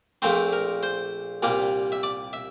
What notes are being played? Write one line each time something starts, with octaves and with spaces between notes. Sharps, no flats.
A#1 A#2 A3 C4 C5
A#4
C5
C2 A#2 G3 A#3
E5
D5
E5